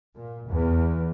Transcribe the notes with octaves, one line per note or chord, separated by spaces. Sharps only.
A#2
E2